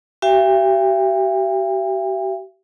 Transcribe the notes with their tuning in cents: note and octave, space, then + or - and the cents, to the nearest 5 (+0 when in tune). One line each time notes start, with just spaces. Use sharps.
G4 -40 E5 +40 G5 +40